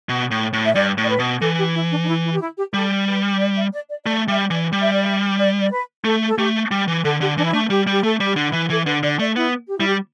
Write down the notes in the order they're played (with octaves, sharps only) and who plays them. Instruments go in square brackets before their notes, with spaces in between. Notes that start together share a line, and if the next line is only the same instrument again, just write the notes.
[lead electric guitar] B2
A2
A2
[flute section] E5
[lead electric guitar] G2 [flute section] D5
[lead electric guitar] A2
[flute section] D5
B4
[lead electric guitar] B2
[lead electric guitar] E3 [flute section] A4
[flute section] G4
E4
D4
D4
E4
E4
G4
E4
G4
[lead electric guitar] G3 [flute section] A4
[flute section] B4
D5
E5
D5
D5
[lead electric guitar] A3 [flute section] D5
[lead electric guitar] G3 [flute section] E5
[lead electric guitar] E3 [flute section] D5
[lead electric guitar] G3
[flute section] E5
D5
E5
D5
D5
B4
[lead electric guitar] A3 [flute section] A4
[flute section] A4
[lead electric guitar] A3 [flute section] G4
[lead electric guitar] G3
E3
[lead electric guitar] D3 [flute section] A4
[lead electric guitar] D3 [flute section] G4
[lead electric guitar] E3 [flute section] D4
[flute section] E4
[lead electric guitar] A3 [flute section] D4
[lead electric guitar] G3 [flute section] G4
[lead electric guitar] G3 [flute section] G4
[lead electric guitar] A3 [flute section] A4
[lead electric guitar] G3
[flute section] G4
[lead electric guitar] D3
[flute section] E4
[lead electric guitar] E3
[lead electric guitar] E3 [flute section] A4
[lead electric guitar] D3 [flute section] B4
[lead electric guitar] D3 [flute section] D5
[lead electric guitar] A3 [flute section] D5
[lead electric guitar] B3 [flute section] E4
[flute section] G4
[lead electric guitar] G3 [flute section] E4
[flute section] G4